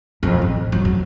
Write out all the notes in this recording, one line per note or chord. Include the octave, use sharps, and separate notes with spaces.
F2
A1
F#3
F2